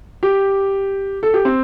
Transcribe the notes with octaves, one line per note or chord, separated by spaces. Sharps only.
G4
A4
G4
C4